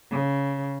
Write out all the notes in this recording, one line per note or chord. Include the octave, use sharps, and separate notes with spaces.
C#3